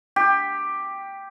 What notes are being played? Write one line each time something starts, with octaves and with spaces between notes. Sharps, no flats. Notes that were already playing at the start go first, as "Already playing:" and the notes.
G4